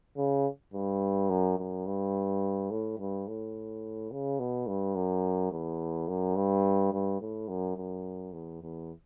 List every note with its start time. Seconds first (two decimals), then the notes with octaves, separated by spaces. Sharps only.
0.17 C#3
0.73 G2
1.29 F#2
1.58 F#2
1.87 G2
2.71 A2
2.98 G2
3.27 A2
4.12 C#3
4.40 B2
4.67 G2
4.95 F#2
5.51 E2
6.08 F#2
6.36 G2
6.92 G2
7.21 A2
7.48 F#2
7.77 F#2
8.33 E2
8.62 E2